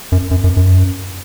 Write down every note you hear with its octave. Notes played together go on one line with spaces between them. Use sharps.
F#2
F#2
F#2
F#2